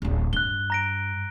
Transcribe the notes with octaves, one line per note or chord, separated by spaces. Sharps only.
D1 A1
G2 F#6 G7
A#5 A#6 D7